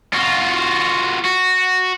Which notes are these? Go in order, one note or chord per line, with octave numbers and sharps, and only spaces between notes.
F4 F#4
F#4